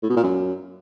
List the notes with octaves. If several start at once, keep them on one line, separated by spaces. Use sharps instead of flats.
A2
B2
A#2
F#2